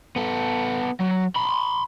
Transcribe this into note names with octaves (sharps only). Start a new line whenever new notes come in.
B3 A4
F#3
B5 C6